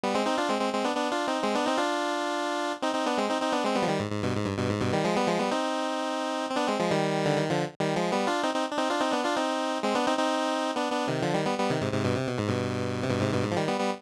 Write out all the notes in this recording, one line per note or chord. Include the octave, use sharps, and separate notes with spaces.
G3 B3
G#3 C4
C4 D#4
D4 F4
G#3 C4
G#3 C4
G#3 C4
B3 D4
B3 D4
D4 F4
C4 D#4
G#3 C4
B3 D4
C4 D#4
D4 F4
C4 D#4
C4 D#4
B3 D4
G#3 C4
C4 D#4
C4 D#4
B3 D4
G#3 C4
G3 B3
F3
D#3 G3
G#2
G#2
G2 B2
G#2
G2
G2 B2
G#2
G2 B2
D#3 G3
F3 G#3
G3 B3
F3 G#3
G3 B3
C4 D#4
C4
B3 D4
G#3 C4
F3 G#3
D#3 G3
D3
D#3
D3 F3
D#3 G3
F3 G#3
G3 B3
D4 F4
C4 D#4
C4 D#4
D4
C4 D#4
D4 F4
C4 D#4
B3 D4
D4 F4
C4 D#4
G#3 C4
B3 D4
C4 D#4
C4 D#4
B3 D4
B3 D4
C3 D#3
D3 F3
D#3 G3
G3 B3
G3 B3
C3 D#3
G#2 C3
G#2 C3
G2 B2
C3
B2
G#2
G2 B2
C3
G2 B2
G#2 C3
G2 B2
G#2
F3
D#3 G3
G3 B3
G3 B3